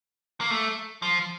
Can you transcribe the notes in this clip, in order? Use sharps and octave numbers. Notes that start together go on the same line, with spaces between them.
A#3
A3
F3